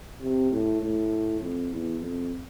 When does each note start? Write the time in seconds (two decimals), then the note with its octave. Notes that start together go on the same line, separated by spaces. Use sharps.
0.20 C3
0.51 A2
0.81 A2
1.40 F2
1.70 E2
2.00 F2